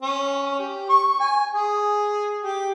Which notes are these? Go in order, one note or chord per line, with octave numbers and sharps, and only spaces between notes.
C#4
G4
C#6
G#5
G#4
G4